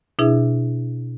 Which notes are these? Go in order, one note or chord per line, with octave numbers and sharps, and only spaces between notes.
B2 D4 E4 G#4 E5